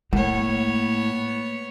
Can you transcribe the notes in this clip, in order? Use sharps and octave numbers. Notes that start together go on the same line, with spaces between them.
A2 G#3 A#3 B3 C#5